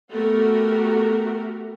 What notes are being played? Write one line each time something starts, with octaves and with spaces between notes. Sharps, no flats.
A3 B3 F#4 G4 A4 A#4